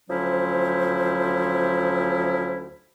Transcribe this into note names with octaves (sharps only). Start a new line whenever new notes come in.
D2 F3 F#3 C#4 E4 C5